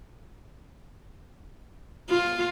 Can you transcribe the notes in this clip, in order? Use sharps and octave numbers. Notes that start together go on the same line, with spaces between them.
F4